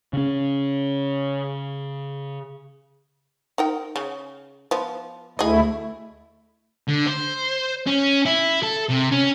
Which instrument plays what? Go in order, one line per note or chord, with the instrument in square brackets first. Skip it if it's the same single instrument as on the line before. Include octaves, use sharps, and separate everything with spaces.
[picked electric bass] C#3 C#4
[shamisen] D#4 A#4 G5
C#3
F3 B3
[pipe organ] D2 A3 E4 [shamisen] G#4 D#5
[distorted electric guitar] D3
C5
C#4
E4
A4
C3
C#4